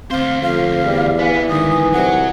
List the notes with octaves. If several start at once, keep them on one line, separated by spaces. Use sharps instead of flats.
D2 C4 C5 F5
F2 F5
E2 G3
E3 B3
G#2 D3 D#3 D#6
C2 F#3 F#5